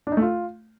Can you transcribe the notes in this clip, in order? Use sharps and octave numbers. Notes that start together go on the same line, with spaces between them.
D4
D#4
A3
F4